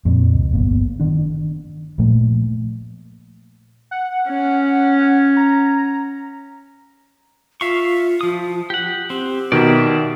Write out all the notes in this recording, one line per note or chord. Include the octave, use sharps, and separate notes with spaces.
F2 A#2
C#2
G1 A#3 B3
D#3 D4
A#2 F3 A3 A#3
F#5
C#4
A#5
F4 E5 F5 C#6
F3 D#6
G4 F#5
C4 G4
B2 D#3 D5 E5